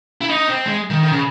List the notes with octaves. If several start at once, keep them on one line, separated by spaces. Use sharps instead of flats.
E4
D#4
C4
G#3
D#3
D#3
C#3